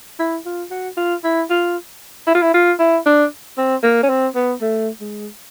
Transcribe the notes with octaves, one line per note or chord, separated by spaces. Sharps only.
E4
F4
F#4
F4
E4
F4
E4
F4
E4
F4
E4
D4
C4
A#3
C#4
C4
B3
A3
G#3